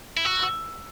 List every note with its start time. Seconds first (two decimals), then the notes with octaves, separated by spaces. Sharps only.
0.17 E4
0.25 F#4 E6
0.43 E6